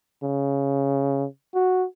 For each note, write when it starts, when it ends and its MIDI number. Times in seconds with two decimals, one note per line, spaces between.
0.23 1.25 49
1.54 1.85 66